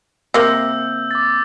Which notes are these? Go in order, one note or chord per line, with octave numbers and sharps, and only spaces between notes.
C3 A#3 E6 G6
D6 A6